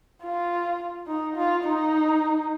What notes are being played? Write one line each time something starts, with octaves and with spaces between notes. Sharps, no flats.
F4
D#4
F4
D#4